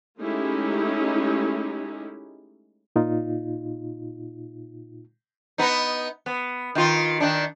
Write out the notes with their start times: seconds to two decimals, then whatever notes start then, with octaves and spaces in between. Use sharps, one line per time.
0.20 G#3 A3 C#4 D#4 E4 G4
2.96 A#2 D#4 F4
5.58 B3 D#4
6.26 B3
6.75 D#3 F4
7.20 D#3 D4